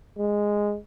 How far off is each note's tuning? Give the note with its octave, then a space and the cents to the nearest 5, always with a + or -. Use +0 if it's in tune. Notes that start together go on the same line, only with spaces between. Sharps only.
G#3 -10